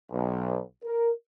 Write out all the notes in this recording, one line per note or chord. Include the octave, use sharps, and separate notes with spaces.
B1
A#4